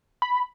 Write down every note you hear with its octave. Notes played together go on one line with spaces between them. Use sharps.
B5